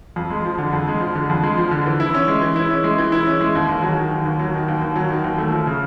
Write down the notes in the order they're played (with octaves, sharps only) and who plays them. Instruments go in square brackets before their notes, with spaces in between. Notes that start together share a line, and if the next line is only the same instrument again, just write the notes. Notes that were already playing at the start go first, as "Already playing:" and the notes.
[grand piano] F2
G#3
F3
D3
F2
G#3
F3
D3
F2
G#3
F3
D3
E3
E4
C#4
G#3
E3
E4
C#4
G#3
E3
E4
C#4
G#3
D#2
D#2
F#3
D#3
D#2
D#2
F#3
D#3
D#2
D#2
F#3
D#3
D#2
A3
F3
C#3